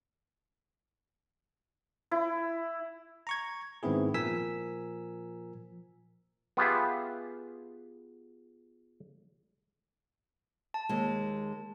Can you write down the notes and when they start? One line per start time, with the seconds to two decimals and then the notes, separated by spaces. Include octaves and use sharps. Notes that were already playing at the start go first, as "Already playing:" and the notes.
2.11 E4
3.27 A#5 C#6 G#6
3.83 G#2 D#3 B3 C4 E4 G#4
4.14 A#2 F3 A#4 G#5 E6 B6
6.57 B3 F4 G4 G#4 E5
10.74 A5
10.89 D#2 G#3